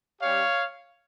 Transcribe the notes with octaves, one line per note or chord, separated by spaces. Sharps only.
G3 C#4 G4 C#5 F5